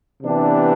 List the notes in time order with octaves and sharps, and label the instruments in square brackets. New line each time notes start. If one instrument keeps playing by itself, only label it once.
[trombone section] C3 E3 B3 D4 G4